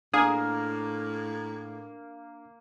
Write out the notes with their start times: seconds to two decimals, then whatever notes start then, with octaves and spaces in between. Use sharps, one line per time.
0.14 A2 A#3 D4 G#4